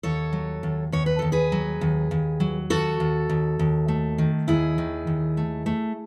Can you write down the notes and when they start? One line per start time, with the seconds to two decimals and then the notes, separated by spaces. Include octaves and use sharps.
0.03 D#2 A4 C#5
0.33 F#3
0.63 D#2
0.92 D#2 C#5
1.06 B4
1.19 D#2 A4
1.32 G#4 B4
1.52 F#3
1.81 D#2
2.11 D#2
2.40 F#3
2.70 D#2 F#4 A4
3.00 D#2
3.29 D#2
3.59 D#2
3.88 A3
4.18 D#3
4.48 D#2 E4 G#4
4.78 D#3
5.07 D#2
5.37 A3
5.66 A3